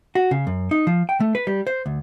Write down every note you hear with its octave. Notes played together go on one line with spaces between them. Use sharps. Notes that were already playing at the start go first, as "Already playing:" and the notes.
F#4
C#3
F#2
D#4
F3
G5
A3
B4
G3
C5
D2